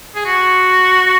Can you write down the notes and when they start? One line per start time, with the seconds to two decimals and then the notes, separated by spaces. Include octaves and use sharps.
0.15 G#4
0.26 F#4